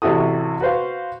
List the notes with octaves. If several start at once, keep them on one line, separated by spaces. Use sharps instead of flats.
A1 C3 E4 F#4 A4 D#6
F#4 B4 C5 F5